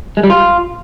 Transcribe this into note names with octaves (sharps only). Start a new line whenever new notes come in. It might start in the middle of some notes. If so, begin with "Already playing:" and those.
G#3
G3
F4